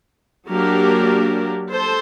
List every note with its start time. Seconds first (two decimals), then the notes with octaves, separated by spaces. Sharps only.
0.49 F#3 A#3 D4 G4 A#4
1.71 A4 C5